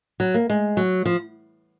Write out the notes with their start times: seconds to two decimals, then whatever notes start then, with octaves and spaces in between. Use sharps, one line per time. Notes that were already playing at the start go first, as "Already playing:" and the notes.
0.20 F#3
0.34 A#3
0.50 G#3
0.77 F#3
1.06 F3